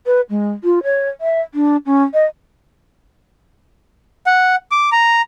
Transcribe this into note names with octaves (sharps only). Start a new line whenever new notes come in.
B4
G#3
F4
C#5
E5
D4
C#4
D#5
F#5
D6
A#5